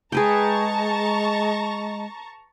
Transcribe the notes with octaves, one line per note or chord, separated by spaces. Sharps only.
G#3 G#4 B4 G5 A5 A#5 C#6